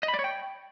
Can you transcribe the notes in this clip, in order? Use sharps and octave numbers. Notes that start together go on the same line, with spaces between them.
D#5
B5
D5
C#5
G5